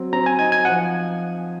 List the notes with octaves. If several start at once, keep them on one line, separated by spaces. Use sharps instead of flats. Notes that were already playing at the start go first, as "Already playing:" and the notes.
Already playing: F#3 C4
C4 A#5
G#5
D#4 G#5
G#5
F3 F#5